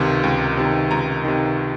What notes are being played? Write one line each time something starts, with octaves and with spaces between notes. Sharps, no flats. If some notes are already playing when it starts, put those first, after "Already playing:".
Already playing: C#2 C3 D#3 C6
C#2
C3 D#3
C#2 A#5
C3 D#3